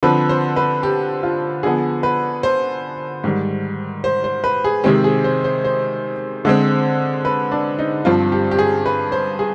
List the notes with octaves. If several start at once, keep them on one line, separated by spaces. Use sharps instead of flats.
D3 F3 C4 B4
C5
B4
G4
F4
D3 F3 B3 G#4
B4
C5
G#2 D#3 G3
C5
C5
B4
G#4
C3 D#3 G#3 C4 G4
G#4
C5
C5
C5
D3 G#3 C4
B4
D4
D#4
G2 F3 C4 F4
G4
G4
G#4
B4
C5
G#4